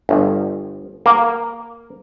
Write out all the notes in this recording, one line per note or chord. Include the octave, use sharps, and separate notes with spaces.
G1
A#3